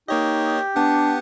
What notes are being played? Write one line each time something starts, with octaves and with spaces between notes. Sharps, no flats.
A#3 D#4 G4 C#5 D#5
B3 D4 F#5